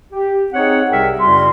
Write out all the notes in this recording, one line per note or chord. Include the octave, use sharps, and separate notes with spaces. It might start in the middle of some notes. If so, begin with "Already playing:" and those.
G4
C4 D#4 G#4 C#5 F#5
C2 C3 G3 A#4 E5 G5
F#2 C#3 G3 E4 F#4 C6